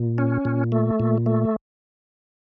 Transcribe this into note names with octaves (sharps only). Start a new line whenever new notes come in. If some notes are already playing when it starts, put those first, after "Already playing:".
Already playing: A#2
C#4
A#2
A3
A#2
A3